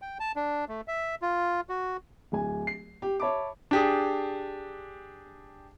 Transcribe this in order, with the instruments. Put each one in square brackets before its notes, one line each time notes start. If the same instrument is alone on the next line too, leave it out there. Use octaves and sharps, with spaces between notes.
[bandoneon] G5
A5
D4
A3
E5
F4
F#4
[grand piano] D1 G#5
C7
G4
C#5 E5 A5 B5 D6
D4 G4 G#4